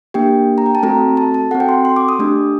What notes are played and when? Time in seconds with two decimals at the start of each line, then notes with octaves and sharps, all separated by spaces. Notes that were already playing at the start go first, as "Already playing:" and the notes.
0.14 A#3 D4 G4 G5
0.58 A#5
0.66 G5
0.75 A5
0.83 A3 C4 F#4 A4 A#5
1.17 A5
1.34 A5
1.51 C4 F#4 A4 F#5
1.60 G5
1.69 C6
1.85 C6
1.96 D6
2.09 D#6
2.19 A3 D4 G4